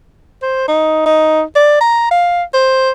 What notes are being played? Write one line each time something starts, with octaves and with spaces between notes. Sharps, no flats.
C5
D#4
D#4
D5
A#5
F5
C5